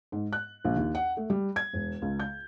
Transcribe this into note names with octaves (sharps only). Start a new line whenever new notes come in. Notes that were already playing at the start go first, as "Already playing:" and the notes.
G#2
F#6
A#1
D#2
F#5
A3
G3
G#6
E1
C#2
G6